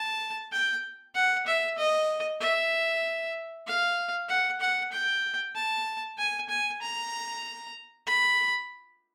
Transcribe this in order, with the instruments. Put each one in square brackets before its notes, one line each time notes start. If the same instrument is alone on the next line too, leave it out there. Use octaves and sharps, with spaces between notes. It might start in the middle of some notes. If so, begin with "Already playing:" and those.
Already playing: [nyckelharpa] A5
G5
F#5
E5
D#5
E5
F5
F#5
F#5
G5
A5
G#5
G#5
A#5
B5